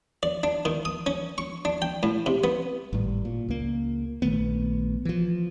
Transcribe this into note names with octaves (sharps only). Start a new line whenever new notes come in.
D5
D4
D#3
D#6
C#4
C#6
D4
G5
A2
C3
B3
G#1 A2 G3
A#2
C#2 A#3
A#1 D#3 A3 B3
E3 F3